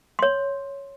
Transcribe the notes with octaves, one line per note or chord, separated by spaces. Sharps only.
C#5 C6